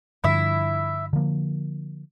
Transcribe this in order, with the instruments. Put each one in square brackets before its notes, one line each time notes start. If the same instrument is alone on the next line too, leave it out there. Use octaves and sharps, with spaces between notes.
[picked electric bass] G2 D3 F3 [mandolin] E4 E5
[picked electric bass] D3 F3 A#3